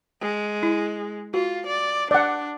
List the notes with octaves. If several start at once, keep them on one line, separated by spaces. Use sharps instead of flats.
G#3
E4
F4 F#4
D5
D4 D5 F#5